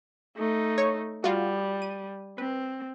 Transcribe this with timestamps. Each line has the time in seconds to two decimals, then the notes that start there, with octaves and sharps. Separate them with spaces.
0.36 A3 D#4
0.78 C#5 C#6
1.24 G3 F4 F#4
1.82 D#7
2.38 C4 B4